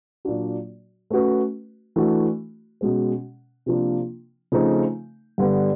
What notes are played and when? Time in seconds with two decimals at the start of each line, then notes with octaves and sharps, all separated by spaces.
0.25 A#2 F#3 A#3 D4 F#4
1.10 A3 C#4 F#4 B4
1.96 E3 A3 D4 F#4
2.81 B2 G#3 C#4
3.66 C3 F3 A#3 D4
4.52 C#3 F3 A3 C4 D#4
5.38 G2 D3 G3 B3